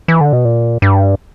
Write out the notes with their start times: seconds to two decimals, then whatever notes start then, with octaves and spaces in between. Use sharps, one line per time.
0.08 E3
0.21 D3
0.33 B2
0.45 A#2
0.82 G2